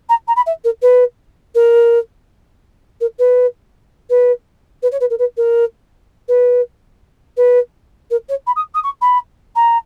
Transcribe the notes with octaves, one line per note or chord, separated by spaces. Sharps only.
A#5
A#5
B5
E5
A#4
B4
A#4
A#4
B4
B4
B4
C#5
B4
A#4
B4
A#4
B4
B4
A#4
C#5
B5
D#6
D#6
C#6
B5
A#5